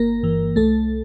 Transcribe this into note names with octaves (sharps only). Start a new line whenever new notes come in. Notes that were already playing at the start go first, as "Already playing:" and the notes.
Already playing: G1 A#3 A#4
G2 E3
C2 A3 A4